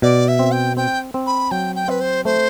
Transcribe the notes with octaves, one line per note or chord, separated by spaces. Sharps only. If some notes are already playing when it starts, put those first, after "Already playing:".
B2 D5
E5
C4
G5
C4 G5
C4
B5
F#3 G5
G5
C4 B4
C5
A3 C5